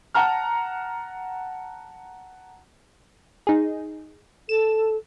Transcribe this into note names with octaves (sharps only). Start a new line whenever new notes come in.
F#5 A5 A#5 F6
D#4 G#4
A4 E7